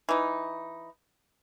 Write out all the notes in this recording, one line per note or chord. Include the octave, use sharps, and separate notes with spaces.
E3 D#4